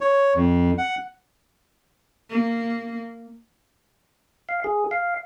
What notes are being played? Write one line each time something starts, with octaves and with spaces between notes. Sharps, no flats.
C#5
F2
F#5
A#3
F5
G#4
F5